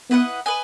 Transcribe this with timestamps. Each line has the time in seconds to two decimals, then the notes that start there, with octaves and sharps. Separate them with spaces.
0.11 B3 E4 B4 D#5 F#5
0.46 B4 D#5 G#5